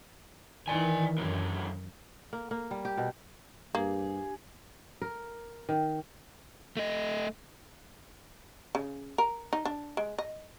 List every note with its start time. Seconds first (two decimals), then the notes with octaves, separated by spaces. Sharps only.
0.68 D#3 E3 D5 G#5
1.18 F#2 D3 F#3
2.33 A#3
2.51 A#3
2.71 G3
2.85 G4
2.97 B2
3.75 G2 A#3 D4 G4 G#4
5.02 A#4
5.69 D#3
6.77 A3 D#5
8.75 C#3
9.18 A#4
9.53 D#4
9.65 D4
9.97 G#3
10.18 D#5